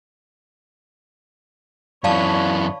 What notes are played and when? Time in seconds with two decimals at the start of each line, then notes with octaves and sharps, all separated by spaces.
2.04 F#2 E3 C#5 D5 F5 A5 B5